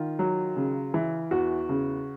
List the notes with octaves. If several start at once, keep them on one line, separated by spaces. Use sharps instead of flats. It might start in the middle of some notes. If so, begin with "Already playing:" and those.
Already playing: D#3 F4
F#3
C#3
E3
E2 F#4
C#3